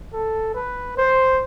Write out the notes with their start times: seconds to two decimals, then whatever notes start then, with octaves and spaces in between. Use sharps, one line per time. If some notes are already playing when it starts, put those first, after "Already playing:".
0.13 A4
0.54 B4
0.97 C5